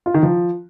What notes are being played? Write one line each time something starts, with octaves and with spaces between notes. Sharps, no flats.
F4
D#3
F3